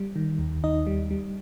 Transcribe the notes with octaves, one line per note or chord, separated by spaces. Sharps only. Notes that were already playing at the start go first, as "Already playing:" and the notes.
Already playing: G3
D#3
D#2
D#2 D#4 D#5
G3
G3